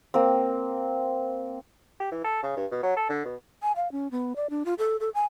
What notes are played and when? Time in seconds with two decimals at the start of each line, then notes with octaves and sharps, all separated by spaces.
0.14 A#3 C4
2.00 G4
2.12 E3
2.24 A4
2.43 C#3
2.57 G2
2.71 B2
2.83 F#3
2.96 A4
3.09 D3
3.25 B2
3.62 G#5
3.76 F5
3.92 C#4
4.11 B3
4.36 D5
4.50 D4
4.65 F4
4.78 A4
5.00 A4
5.15 G#5